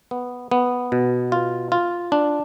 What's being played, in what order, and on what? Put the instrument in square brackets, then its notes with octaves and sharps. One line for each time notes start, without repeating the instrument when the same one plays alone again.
[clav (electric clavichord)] B3
B3
B2
F4
F4
D4